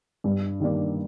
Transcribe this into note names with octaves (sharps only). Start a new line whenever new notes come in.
G2
D#3 G3 A#3 D4